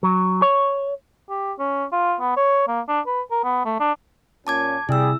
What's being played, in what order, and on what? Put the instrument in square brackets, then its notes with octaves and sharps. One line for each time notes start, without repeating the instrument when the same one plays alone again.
[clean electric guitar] F#3
C#5
[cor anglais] G4
C#4
F4
B3
C#5
A#3
D4
B4
A#4
B3
A3
D4
[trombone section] A#2 C#4 [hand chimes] A5 D6 G#6
[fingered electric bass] C3 [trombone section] G3 G#4 [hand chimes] E4 E6